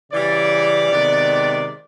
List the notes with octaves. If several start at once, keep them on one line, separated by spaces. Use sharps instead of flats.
C#3 E3 G3 D5
C3 D#3 G#3 B3